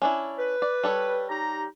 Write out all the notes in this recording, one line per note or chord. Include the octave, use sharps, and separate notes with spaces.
C#4 D4 E4
B4
D5
G3 A4 C#5
D#4 G4 A#5